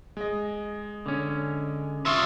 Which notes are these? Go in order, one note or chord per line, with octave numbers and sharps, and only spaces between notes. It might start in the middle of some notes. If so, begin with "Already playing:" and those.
G#3 D#5
D3 C#4
F4 E5 C6 C#6 D#6